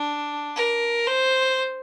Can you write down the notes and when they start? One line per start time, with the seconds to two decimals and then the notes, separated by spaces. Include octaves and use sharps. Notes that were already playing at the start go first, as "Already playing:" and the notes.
Already playing: D4
0.56 A#4
1.07 C5